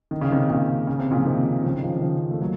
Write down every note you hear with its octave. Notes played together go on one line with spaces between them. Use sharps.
D#3
C#3
C3 D#3
A#2 C#3
C#3
C3
A#2 C#3
F3
C3 D#3
C#3 F3
D#3
C#3 F3
D#3
C#3 F3
A3
F#3 A#3